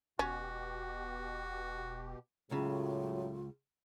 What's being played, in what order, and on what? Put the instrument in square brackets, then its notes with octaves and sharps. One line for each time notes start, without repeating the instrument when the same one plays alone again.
[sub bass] E1 [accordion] B2 G4 [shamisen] C#4 [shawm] F#4
[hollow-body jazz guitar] C#2 C#3 [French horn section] A2 F#3 [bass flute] F4